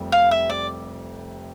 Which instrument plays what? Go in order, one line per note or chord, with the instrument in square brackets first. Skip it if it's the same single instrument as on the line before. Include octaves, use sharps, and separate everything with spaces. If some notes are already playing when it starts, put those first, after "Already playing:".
Already playing: [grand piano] F1 F2 C3 G3
[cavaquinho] F5
E5
D5